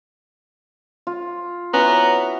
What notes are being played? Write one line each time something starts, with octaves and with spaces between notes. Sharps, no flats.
F4
B3 C#4 E4 F#4 A#5